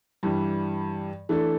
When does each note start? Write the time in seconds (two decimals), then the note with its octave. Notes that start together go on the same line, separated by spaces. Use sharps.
0.23 G2 E3 G3
1.29 E3 A3 D4 A4